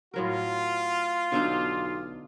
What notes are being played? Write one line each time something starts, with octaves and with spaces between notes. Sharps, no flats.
A2 F#3 F4 A#4
B1 D3 D4 D#4